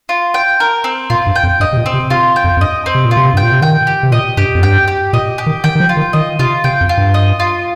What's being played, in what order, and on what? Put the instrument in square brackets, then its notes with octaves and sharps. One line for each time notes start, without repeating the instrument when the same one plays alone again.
[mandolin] F4
G5
A#4
C4
[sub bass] A#2 [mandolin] F4
[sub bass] G2
[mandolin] G5
[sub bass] F2
[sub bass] G2 [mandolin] D#5
[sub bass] C3
A#2
[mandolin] C4
[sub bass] C3
[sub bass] C3 [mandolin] F4
[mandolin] G5
[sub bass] F2
F2
[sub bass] G2 [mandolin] D#5
[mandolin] C4
[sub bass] C3
A#2
[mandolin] F4
[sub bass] C3
[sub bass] G2 [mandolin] G5
[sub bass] A#2
C3
[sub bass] D#3 [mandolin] G5
[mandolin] G4
[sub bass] C3
[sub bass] A#2 [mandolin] D#5
[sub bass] G2 [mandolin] G4
[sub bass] F2
[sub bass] G2 [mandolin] G5
[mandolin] G4
[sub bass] A#2 [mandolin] D#5
[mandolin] G4
[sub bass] D#3
[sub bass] D#3 [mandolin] G5
[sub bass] D#3
F3
[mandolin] F4
[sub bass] D#3
[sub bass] D#3 [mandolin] D#5
[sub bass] C3 [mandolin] F4
[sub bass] C3 [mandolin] G5
[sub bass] F2
[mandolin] F4
[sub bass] G2
[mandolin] D#5
F4